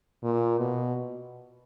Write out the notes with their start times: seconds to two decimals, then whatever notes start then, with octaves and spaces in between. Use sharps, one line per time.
0.23 A#2
0.58 B2